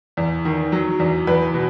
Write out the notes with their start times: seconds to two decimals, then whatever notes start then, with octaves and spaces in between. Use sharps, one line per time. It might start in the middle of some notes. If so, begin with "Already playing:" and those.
0.17 E2
0.45 D#3
0.72 F#3
1.00 E2
1.27 E2 B4
1.54 B2